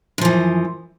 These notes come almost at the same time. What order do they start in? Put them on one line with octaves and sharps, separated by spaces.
F#2 F3 E3